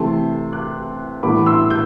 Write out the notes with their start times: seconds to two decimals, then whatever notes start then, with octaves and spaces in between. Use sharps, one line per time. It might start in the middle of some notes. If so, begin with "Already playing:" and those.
Already playing: C3 E3 A3 A5 C6
0.52 D6 F#6
1.23 A2 E3 G3 B3 B5 D6
1.46 C6 E6
1.70 G6